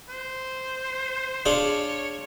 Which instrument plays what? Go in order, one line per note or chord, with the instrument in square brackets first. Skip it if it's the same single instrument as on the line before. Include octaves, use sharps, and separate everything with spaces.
[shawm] C5
[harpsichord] D4 F4 G#4 [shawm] C#5